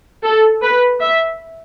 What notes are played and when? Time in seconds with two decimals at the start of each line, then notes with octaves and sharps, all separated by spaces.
0.24 A4
0.62 B4
1.01 E5